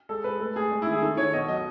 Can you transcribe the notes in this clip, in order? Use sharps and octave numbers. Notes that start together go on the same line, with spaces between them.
G#3 A4
G#3 B4
A3 A4
A3 G#4
G#3
E4
D#3
G#4
D#3 A4
D#3 C#5
B2 D#5
F#3 D#5